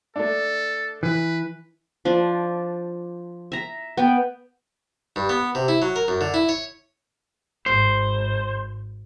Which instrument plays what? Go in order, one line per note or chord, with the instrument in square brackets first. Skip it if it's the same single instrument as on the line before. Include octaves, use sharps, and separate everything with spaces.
[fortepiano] A3 D4 [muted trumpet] A4
[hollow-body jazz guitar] E3 [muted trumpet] B4
[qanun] F3 D4
E5 A#5
B3 G5
[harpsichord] G2
B3
C3
E4
F#3
A#4
F#2
D3
E4
C#5
[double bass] G#1 [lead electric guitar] C5